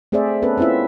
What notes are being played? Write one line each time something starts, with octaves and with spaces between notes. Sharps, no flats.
A3 C4 G#4 C5 D5 E5
B3 C#4 A4 B4
C4 C#4 E4 F4 E5